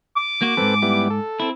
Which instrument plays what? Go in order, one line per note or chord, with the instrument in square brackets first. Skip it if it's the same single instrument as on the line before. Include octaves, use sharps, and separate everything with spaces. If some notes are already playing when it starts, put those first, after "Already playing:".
[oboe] D6
[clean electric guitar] A#3 F#4
[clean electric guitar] F2 G#2 [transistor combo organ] C4 A4 B4
[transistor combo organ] G3 B3 E4
A4
[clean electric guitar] C4 E4